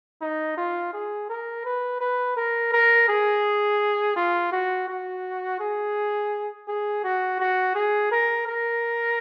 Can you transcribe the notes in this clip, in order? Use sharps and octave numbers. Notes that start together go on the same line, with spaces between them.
D#4
F4
G#4
A#4
B4
B4
A#4
A#4
G#4
F4
F#4
F#4
G#4
G#4
F#4
F#4
G#4
A#4
A#4